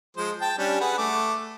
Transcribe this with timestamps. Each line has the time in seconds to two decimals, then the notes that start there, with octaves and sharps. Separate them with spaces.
0.17 F3 G#3 C5
0.41 G5 A5
0.58 G3 C#4 D4
0.80 G#4 B4 F#5
0.98 A3 D6